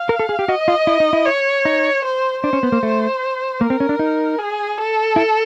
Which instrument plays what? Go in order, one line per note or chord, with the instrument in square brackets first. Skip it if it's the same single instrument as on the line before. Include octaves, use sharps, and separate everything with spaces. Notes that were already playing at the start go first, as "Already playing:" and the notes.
Already playing: [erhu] F5
[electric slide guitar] A#4
A4
G#4
G4
[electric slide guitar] F#4 [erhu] D#5
[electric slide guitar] F4
E4
D#4
E4
[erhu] C#5
[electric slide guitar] D#4
[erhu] C5
[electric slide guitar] D4 [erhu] C5
[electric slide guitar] C#4
B3
A#3
A3
[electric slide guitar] A#3 [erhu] A#4
[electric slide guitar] C4
C#4
D4
D#4
[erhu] G#4
A4
[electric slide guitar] E4